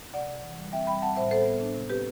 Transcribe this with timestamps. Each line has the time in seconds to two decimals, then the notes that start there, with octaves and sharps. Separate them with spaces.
0.14 C3 D5 F#5
0.28 C3
0.43 E3
0.58 G3
0.72 C4 E5 G5
0.87 G3 G5 B5
1.02 C4 F#5 A5
1.16 A2 C5 E5
1.31 B3 A4 C5
1.46 B3
1.61 D4
1.75 C3
1.90 C4 G4 B4